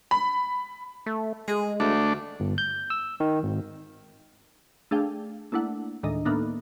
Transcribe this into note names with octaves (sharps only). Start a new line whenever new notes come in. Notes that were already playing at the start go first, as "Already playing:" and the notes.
B5
A3
G#3 G#4
D2 A3 D4
G1
G6
E6
D#3
G#1
A3 D4 G#4 F5 G5
A3 A#3 D4 E4 F#5
D2 A2 D#3 G#3 D4 D#5
A2 A#3 B3 D4 D#4